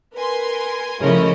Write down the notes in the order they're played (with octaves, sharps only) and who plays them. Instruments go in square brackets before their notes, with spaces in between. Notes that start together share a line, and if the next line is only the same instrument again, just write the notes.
[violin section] A#4 G#5 C6 [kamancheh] B4
[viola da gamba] C#3 F3 [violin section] A3 E4 D#5 [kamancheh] A#4 C#5